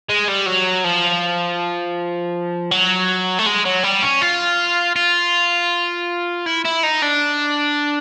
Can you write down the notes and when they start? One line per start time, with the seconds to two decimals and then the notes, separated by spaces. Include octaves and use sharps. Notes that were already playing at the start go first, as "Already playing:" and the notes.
0.09 G#3
0.28 G3
0.46 F#3
0.84 F3
2.71 F#3
3.39 A3
3.46 G#3
3.65 F#3
3.83 G3
4.03 C#4
4.22 F4
4.96 F4
6.46 E4
6.65 E4
6.83 D#4
7.03 D4